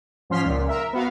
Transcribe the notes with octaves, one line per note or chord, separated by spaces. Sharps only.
G#2 F3 C#4 C6 F6 B6
C#2 A#2
A#4 E5
B3 F#4 F5